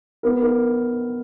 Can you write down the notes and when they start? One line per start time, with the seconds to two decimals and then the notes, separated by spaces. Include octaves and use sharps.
0.23 B3 A#4
0.42 A#4